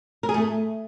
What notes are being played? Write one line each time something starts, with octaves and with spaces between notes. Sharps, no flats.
A#4
G#4
A3